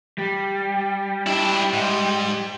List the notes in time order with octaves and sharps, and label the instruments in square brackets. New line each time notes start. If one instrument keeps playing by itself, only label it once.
[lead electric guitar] G3
[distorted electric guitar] D4 E4
G#2